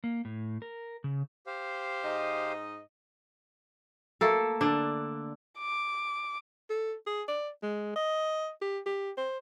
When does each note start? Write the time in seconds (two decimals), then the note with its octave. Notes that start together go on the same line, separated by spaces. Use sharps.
0.04 A#3
0.25 A2
0.62 A#4
1.04 C#3
1.47 G4 C5 F5
2.04 G#2 D#4 D#5
4.21 A3 A#3 A4
4.61 D3 D4
5.59 D6
6.70 A4
7.07 G#4
7.28 D5
7.63 G#3
7.96 D#5
8.61 G4
8.86 G4
9.18 C5